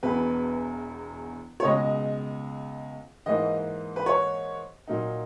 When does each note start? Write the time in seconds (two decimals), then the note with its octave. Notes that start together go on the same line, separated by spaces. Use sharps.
0.03 E1 E2 B2 B4
1.60 C#5
1.64 C#2 B2 G#3 D#5
3.26 G#2 E3 A#3 D#4 D#5
3.96 B4
4.06 C#5
4.88 A#2 F#3 A#3 D#4